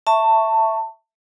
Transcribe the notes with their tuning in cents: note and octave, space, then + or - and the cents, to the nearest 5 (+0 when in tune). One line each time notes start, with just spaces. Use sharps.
E5 +0 A5 +20 C#6 +0